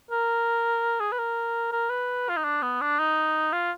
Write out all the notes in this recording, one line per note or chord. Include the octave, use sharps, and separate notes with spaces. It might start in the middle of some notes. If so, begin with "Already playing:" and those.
A#4
G#4
B4
A#4
A#4
B4
F4
D#4
D4
B3
D4
D#4
F4